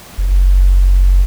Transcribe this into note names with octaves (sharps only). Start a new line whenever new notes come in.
F#1